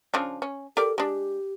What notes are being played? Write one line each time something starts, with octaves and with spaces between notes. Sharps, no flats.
C#3 F3 D4
C#4
G4 A4 A#4 D5
G#3 D4 G4